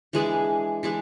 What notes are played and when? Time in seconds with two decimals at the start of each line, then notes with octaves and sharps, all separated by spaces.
0.13 E3 G#3 D4 G#4
0.83 E3 G#3 D4 G#4